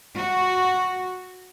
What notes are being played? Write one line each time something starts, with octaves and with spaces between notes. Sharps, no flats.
F#4